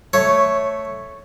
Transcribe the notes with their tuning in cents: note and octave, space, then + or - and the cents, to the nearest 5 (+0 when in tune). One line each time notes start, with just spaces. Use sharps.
A3 +0 C#5 +0